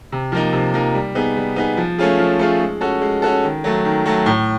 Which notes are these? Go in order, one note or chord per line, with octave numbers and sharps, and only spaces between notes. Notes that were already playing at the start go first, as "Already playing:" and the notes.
C3
F3 A#3 D#4
C3
F3 A#3 D#4
G3
B3 D#4 G#4
G3
B3 D#4 G#4
F3
A3 C#4 F4 G#4
F3
A3 C#4 F4 G#4
G#3
C#4 F#4 A4
G#3
C#4 F#4 A4
D#3
F#3 A3
D#3
F#3 A3
A2